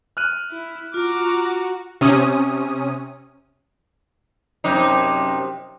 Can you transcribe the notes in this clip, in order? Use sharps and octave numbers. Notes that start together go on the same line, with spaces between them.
F6 F#6 D#7
E4
F4 F#4 A#5 D6
C3 C#4 D#6
F#2 C3 D#4